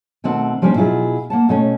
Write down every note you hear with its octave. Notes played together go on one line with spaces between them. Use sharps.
B2 D#3 A3 C4 F#5
F3 G3 A#3 C#4 D4 C5
B2 F#3 E4 F4 G#4
A#3 F#5 A5
B2 A3 C#4